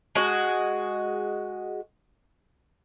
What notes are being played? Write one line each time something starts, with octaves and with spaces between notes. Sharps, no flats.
G#3 F#4